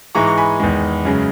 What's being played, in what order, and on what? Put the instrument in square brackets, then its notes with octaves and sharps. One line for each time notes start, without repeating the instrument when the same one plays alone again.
[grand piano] G#2 E3 G#3 A#5 C#6
C#6
G#5 B5
E2 D#3 G#3
F#2 C#3 G#3